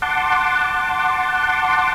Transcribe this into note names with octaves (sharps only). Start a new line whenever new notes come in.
F#5 A5 C6 D6